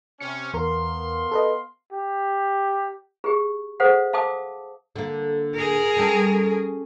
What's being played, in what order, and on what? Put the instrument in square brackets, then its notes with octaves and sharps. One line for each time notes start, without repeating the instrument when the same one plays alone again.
[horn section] C3 C#4 [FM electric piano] C#7
[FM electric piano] E2 A#4 [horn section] B3 F5 C6
[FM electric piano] A4 B4 D#5
[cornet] G4
[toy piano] G4 G#4
G#4 A4 C5 F5 F#5
F5 A5 D6 D#6
[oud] D3 A#3
[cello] G#4 A#4
[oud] G3 C#4 A4